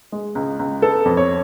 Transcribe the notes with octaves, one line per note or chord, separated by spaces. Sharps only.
G#3
C#2
C#2
B3 A4
F2
C#5